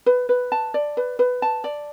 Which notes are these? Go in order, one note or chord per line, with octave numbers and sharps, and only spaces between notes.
B4
B4
A5
D5
B4
B4
A5
D5